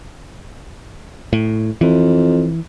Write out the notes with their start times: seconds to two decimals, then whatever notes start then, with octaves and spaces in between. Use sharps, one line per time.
1.33 A2
1.81 F2 E3